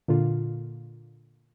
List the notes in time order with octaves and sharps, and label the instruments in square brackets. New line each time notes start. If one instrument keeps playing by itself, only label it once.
[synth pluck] A#2 D3 F4